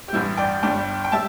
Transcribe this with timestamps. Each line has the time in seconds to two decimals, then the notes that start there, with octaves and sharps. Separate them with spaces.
0.08 G4
0.13 A1 G2 E3 G3 E4
0.37 D5 G5
0.63 G1 G2 G3 D5 G5
1.04 G5
1.12 G3 E5 A5